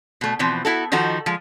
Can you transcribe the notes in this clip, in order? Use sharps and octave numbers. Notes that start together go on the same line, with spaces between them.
B2 A3
B2 E3 F3 C4
B3 E4 F#4 A4
D#3 F3 D#4 F#4 A4
F3 G#3